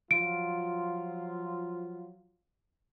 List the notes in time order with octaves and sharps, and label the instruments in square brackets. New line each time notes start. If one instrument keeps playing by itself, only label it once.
[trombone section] F3 F#3 F4 [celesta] D7